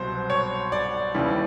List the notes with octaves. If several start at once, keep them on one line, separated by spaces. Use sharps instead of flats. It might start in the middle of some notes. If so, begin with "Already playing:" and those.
Already playing: C2 B2 F#3 C5
C#5
D5
D#2 C#3 E3 G3